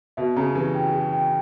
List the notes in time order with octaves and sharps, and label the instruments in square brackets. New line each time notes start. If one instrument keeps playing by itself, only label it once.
[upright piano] B2 [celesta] E5
[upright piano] C#3 [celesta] A#5
[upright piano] E3 [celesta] G4
[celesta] G5
G#4
G5